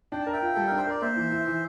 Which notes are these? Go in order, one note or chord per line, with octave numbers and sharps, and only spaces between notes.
D4 G5
A5
A#4
E5 G5
F4
G3 A4
D4 A#4
C5
A#4 D5
A#3 C5 E5
E3
E4
E3